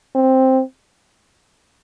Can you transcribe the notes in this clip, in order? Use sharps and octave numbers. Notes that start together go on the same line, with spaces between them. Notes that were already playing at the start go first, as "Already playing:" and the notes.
C4